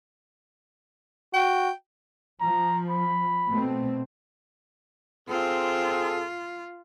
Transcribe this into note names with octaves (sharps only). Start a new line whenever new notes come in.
F#4 G5
F3 A#5
B5
B2 A3 C4
C4 F4 G#4 A4